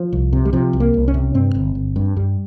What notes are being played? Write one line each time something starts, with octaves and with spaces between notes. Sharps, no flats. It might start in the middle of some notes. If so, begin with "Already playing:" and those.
Already playing: F3
C2
C3
G3
C3 F3
C2
A#3
C2
C#4
C3
G2 C4
G1
G1
G2
G2 G3